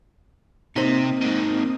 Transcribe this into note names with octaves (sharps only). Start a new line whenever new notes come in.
C3 A#3 C4 D#4 C5 D#6
G#2 D#3